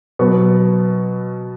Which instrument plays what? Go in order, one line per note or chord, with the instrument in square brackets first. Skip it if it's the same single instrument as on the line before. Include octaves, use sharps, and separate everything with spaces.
[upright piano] B2 F#3 B3 C#6